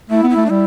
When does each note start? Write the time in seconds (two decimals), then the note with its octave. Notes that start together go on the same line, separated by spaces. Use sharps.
0.10 A3 E4
0.23 B3
0.30 E4
0.37 A3
0.46 D4
0.50 G3 E4